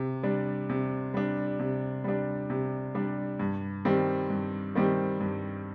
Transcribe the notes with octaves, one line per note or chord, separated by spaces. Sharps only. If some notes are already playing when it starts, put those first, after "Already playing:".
Already playing: C3
G3 D4
C3
G3 D4
C3
G3 D4
C3
G3 D4
G2
D#3 G3 C4 G4
G2
D#3 G3 C4 G4
G2